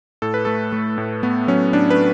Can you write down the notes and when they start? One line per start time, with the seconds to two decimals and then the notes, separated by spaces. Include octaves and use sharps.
0.22 A2 A4
0.34 B4
0.45 A3 A4
0.72 A3
0.98 A2
1.23 A3 B3
1.48 F#3 C#4
1.73 A2 D4
1.90 B4